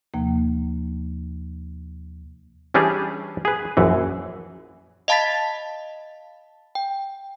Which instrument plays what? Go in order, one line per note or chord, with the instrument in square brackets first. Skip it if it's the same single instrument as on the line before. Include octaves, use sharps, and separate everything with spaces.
[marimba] D#2 C3 F3 A#3
[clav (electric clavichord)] E3 G3 C#4 D4 G4 G#4
G#4 B4
A#1 F#2 E3
[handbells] D#5 F5 A5 B5 A6 B6
G5